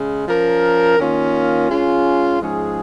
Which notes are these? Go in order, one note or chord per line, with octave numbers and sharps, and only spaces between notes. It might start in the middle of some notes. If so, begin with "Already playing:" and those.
Already playing: C#3 G#3
F3 C#4 A#4
D#3 A#3 C#4 F4
G#3 C#4 F4
G#2 F3 G#3 C#4 G#4